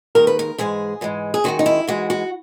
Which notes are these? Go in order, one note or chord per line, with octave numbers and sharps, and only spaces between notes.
D#2 D#3 G#3 A#4
B4
A#4
G#2 E3 G#3 G#4
G#2 E3 G#3
G#4
F#2 D#3 G#3 F#4
D#4
E4
G#2 E3 G#3 F#4
F#4